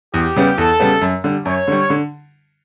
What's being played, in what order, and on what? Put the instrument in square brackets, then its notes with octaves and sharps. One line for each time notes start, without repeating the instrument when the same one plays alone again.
[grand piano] E2 [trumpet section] G4
[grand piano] C#3 G3 B3
[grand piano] E2 [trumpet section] A4
[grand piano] C#3 G3 B3
F#2
D3 G3
[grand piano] F#2 [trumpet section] C#5
[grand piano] D3 G3
D3